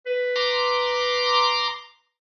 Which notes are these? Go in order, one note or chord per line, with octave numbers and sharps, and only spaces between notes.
B4
A#5 C6 D6